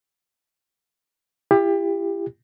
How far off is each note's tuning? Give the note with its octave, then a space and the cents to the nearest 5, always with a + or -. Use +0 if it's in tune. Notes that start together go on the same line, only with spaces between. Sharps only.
E4 +45 G4 +25